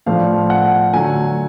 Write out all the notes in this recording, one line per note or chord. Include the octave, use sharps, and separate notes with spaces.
A2 F3 A3 D4 F5
F#5
D3 F#3 A3 G#5